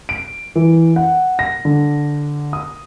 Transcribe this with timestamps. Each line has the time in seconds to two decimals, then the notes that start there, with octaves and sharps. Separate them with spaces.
0.09 D7
0.56 E3
0.96 F#5
1.39 A#6
1.65 D3
2.53 D#6